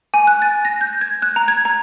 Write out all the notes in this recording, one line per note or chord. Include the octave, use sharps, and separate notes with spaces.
G#5
F#6
A6
A#6
G6
G#6
F#6
A#5
G#6
A#5